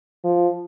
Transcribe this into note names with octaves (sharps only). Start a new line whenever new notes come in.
F3